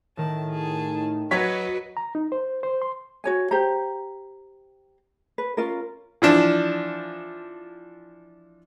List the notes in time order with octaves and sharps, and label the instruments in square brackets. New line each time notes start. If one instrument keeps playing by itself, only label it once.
[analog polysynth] A2 D#3 [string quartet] A5
[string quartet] G#4 A5
[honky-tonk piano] F#3 C#5 B6 [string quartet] F#4 B4 D#5
[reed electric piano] A#5
D#4
C5
C5
C6
[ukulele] F#4 C#5 G#5
G4 C5 A#5
B4
C#4 F4 A#4
[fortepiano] E3 F3 D4